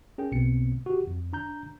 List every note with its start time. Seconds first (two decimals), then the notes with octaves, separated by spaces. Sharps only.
0.18 C#4 G#4 A#4 G5
0.32 B1 B2 B3 C4 C#7
0.86 F#4 G4
1.07 F2
1.33 D4 A#5 G6